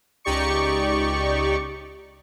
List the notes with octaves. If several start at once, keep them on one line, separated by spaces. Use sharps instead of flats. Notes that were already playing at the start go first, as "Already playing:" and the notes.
C#2 D#4 G4 D5 C#6 C#7